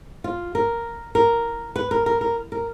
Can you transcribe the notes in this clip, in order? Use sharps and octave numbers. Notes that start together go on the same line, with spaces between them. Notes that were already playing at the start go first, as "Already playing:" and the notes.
F4
A#4
A#4
B4
A#4
A#4
A#4
A#4